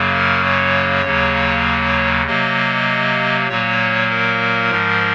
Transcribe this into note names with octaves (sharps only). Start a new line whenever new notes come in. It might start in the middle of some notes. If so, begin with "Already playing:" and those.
Already playing: F#2 C#3 F#3 A#3
A#4
C#5
D#2 C#3 F#3 A#3
C3 F#3 A#3 D#5
A#2 F#3 A#3 C#5
A#4
G#2 F3 G#3